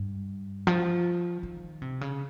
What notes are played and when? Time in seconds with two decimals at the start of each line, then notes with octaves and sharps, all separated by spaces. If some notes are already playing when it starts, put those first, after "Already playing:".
Already playing: G2
0.67 F3
1.43 D#3
1.82 C3
2.01 C#3